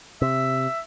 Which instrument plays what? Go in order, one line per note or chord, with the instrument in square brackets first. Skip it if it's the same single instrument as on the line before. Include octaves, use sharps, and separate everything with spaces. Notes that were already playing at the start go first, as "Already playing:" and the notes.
[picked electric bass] C3 [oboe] E5